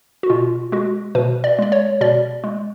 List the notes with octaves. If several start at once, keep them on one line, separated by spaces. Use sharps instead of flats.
F#4
B2 F4
G#3 F#4
B2 B4
D5
G#3 D5
C#5
B2 D5
G#3